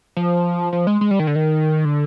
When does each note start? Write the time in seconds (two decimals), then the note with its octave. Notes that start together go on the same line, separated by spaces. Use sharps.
0.17 F3
0.73 F3
0.87 G#3
1.01 G#3
1.11 G3
1.19 D#3
1.27 D3
1.35 D#3
1.85 D3